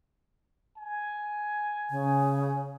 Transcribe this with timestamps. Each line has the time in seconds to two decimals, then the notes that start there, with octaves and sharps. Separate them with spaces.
0.77 G#5
1.90 C#3